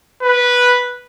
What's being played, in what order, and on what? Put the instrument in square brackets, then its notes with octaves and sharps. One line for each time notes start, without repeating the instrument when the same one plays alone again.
[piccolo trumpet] B4